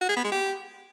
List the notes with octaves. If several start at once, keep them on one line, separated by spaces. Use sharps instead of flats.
F#4
G#4
B3
G#3
G4